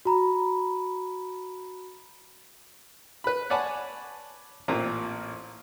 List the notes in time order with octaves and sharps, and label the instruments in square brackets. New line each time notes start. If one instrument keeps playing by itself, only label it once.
[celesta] F#4 A#5 B5
[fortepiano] B4 B5
C#5 D5 F#5 G#5 A5 B5
A1 A#2 A#3 C4 A#5